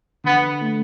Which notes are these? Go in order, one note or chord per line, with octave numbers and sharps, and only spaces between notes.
D3 B3
A3